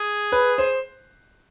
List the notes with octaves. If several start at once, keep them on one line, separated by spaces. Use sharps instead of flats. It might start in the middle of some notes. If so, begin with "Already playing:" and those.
Already playing: G#4
B4
C5